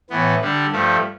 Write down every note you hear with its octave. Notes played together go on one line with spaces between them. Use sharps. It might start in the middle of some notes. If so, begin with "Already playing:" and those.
A2 E3 B3
D3 G3 D4
G2 F3 A3